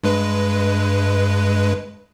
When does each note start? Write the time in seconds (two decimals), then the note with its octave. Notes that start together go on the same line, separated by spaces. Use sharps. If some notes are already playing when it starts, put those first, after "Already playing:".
0.03 G2 G#3 B4